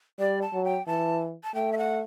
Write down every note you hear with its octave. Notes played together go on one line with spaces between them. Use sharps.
G3 D5
A5
F#3
G5
E3 A5
A5
A3 G5
E5
F#5